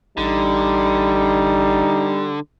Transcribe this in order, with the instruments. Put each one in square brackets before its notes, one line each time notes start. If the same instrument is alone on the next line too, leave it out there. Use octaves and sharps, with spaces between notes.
[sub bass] A1 [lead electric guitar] D3 [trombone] G3 [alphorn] D#4